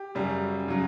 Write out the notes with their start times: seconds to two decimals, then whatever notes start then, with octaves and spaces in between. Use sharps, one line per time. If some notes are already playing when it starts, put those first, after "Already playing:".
Already playing: G4
0.15 F#2 C#3 G3
0.68 C#3 F#3